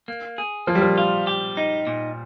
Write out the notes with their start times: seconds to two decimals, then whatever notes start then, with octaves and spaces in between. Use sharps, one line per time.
0.08 A#3
0.38 G#4
0.67 F3 A#3
0.75 G3
0.82 F3
0.98 F4
1.27 G4
1.57 D#4
1.87 A#2